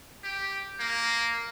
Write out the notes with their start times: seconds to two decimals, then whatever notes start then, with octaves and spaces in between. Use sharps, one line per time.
0.24 G4
0.79 A#3